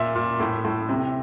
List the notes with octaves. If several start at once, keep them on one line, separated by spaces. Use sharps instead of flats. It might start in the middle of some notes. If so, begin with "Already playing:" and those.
Already playing: A#2 E5
A#2
A2
A2
C3